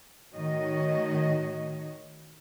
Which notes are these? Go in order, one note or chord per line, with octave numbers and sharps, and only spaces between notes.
A2 D#3 F#4 C#5 D#5